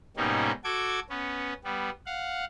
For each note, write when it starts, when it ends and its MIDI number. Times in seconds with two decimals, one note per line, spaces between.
0.17 0.52 44
0.17 0.52 47
0.17 0.52 55
0.17 0.52 58
0.17 0.52 61
0.17 0.52 63
0.64 1.00 66
0.64 1.00 69
0.64 1.00 86
0.64 1.00 92
1.10 1.53 59
1.10 1.53 61
1.64 1.90 55
1.64 1.90 59
2.06 2.45 77
2.06 2.45 78